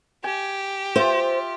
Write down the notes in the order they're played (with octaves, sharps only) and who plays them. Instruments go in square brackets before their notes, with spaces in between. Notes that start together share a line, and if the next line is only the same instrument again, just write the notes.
[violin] G4 [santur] G#5
[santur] F4 E5 [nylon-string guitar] C5